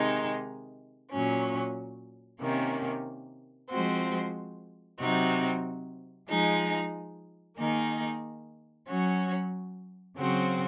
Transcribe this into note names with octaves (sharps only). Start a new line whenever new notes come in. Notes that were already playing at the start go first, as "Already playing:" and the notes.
Already playing: C3 D#3 G#3 D#4
A#2 F#3 C#4
C3 D#3 A#3 C#4
F3 G#3 C4 F#4 C5
C3 F#3 C4 D#4 F#4
F3 G#3 D#4 G#4
D#3 A#3 D#4 G#4
F#3 C#4 F#4
C#3 F#3 C4 F#4 C5